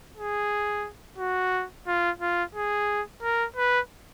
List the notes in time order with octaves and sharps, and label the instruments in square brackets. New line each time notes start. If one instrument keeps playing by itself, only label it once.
[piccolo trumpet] G#4
F#4
F4
F4
G#4
A#4
B4